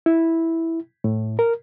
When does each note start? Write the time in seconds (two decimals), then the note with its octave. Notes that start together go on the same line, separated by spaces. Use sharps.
0.06 E4
1.04 A2
1.39 A#4